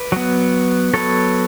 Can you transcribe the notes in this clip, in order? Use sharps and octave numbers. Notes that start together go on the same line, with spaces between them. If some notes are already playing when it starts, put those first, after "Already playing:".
Already playing: B4 D5
F#3 B3
F#3 B3 A4 C#5